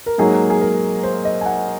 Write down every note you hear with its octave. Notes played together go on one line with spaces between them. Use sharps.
A#4
G#2 F#3 A#3 G#4
G#4
A#4
C5
D#5
G#5
F#5